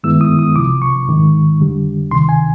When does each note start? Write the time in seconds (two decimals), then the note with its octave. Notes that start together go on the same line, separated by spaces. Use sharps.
0.04 G2 D#3 G#3 B3 E4 E6
0.21 D#6
0.39 D#6
0.56 C2 C3 F3 D6
0.82 C#6
1.07 G#2 D#3 G#3
1.60 F2 D3 G3
2.11 D2 C3 D#3 C6
2.29 G#5